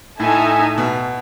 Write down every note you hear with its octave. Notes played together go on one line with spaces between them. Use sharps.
A2 D#4 A4 E5 G#5
B2